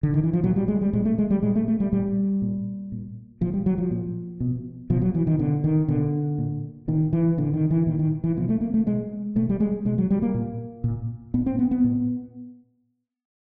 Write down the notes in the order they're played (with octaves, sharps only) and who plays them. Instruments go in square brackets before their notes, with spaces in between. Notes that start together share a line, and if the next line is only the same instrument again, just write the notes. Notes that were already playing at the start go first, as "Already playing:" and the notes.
[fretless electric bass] D3
D#3
E3
F3
A#2 F#3
G3
G#3
G3
A#2 G#3
A3
G#3
G3
A#2 G#3
A3
A3
G3
A#2 G3
A#2
A#2
A#2 F3
G3
F#3
F3
A#2
B2
B2 F3
F#3
E3
D#3
B2 D3
D#3
B2 D3
A#2
A#2 D#3
E3
A#2 D3
D#3
E3
A#2 D#3
D#3
E3
B2 F3
A3
A#3
A3
B2 G#3
B2 A3
G3
G#3
B2 G#3
F#3
G3
A#3
A#2
A#2
A#2 B3
C4
B3
B3
A#2